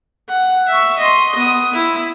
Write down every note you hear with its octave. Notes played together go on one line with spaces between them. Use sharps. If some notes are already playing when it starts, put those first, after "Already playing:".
F#5
E5 C#6
D#5 C6
B3 D#6
E4